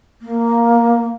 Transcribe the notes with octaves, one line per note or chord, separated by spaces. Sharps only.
A#3